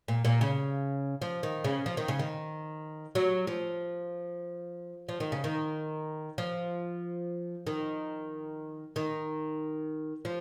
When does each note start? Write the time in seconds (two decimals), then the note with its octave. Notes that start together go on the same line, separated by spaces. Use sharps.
0.08 A#2
0.25 A#2
0.41 C#3
1.22 F3
1.43 D#3
1.64 C#3
1.86 F3
1.97 D#3
2.08 C#3
2.19 D#3
3.15 F#3
3.47 F3
5.09 F3
5.20 D#3
5.32 C#3
5.44 D#3
6.38 F3
7.67 D#3
8.96 D#3
10.25 F3